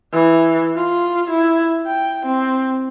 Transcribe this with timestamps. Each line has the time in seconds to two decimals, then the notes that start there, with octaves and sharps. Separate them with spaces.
0.13 E3
0.76 F4
1.30 E4
1.87 G5
2.26 C4